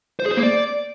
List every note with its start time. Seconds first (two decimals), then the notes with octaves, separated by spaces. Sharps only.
0.20 C5
0.25 G#4
0.31 C5
0.37 A#3
0.43 D5